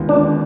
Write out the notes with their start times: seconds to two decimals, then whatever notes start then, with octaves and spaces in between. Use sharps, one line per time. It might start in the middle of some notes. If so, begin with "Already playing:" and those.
Already playing: D#2 D3 G#3 B3 F4
0.09 D4